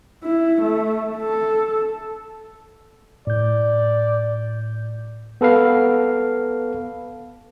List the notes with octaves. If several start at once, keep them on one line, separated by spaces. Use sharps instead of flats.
E4
A3
A4
A2 D5 G6
B3 A4 B4 F5